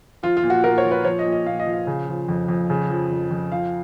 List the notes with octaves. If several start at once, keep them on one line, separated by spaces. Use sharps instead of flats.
F3 F4
F4
A#2
F#4
A#2 A#4
C#5
F3
B4
F3 C#5
D#5
A#2
D#5
A#2 F5
D#5
F3
F5
C#3
F3
F2
F2
C#3
F3
F2
F2
F3 F5